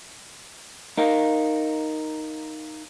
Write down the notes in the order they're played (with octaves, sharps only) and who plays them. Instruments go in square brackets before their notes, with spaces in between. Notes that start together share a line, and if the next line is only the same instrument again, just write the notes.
[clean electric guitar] D#4 A#4 F5